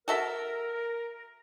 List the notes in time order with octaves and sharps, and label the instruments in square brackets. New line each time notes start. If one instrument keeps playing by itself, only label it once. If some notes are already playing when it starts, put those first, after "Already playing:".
[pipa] F#4 A4 E5 [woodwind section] A#4